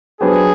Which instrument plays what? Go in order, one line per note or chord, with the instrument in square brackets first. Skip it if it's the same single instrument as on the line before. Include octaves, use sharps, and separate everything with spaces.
[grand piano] F#3 B3 D4 G4 C5 [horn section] G#4